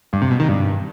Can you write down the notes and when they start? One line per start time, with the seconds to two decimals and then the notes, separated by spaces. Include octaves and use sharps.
0.13 G2
0.22 C3
0.31 B2
0.40 D#3
0.49 G2